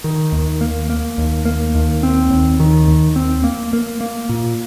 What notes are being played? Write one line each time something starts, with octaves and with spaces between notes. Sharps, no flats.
D#3
D#2
A#3
A#3
D#2
A#3
D#2
C4
D#2
D#3
D#2
C4
A#3
A#3
A#3
A#2